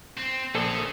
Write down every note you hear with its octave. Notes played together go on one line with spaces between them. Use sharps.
C4
A#1 C#4 G#4 A4